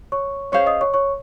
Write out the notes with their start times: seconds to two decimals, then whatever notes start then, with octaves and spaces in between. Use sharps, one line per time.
0.12 C#5 C#6
0.52 C#4 G#4 C5 C#5 F5 C#6
0.66 D#5 D#6
0.81 C#5 C#6
0.94 C#5 C#6